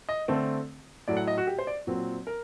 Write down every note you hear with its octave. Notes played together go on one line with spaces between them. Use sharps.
D#5
D3 A3 C4
A2 F#3 A3 D5
F#5
D#5
F#4
G4
C5
D5
A#2 F#3 C4
A#4